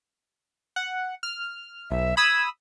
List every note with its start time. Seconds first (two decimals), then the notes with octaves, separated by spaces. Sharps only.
0.76 F#5
1.23 F6
1.91 B1 E5
2.17 B5 D#6 E6 G#6